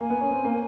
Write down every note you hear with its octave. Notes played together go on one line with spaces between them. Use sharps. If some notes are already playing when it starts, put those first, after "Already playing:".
A#3 G#5
B3
C#4
C4
A#3